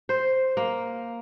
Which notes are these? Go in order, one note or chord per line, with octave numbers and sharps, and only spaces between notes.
C5
A#3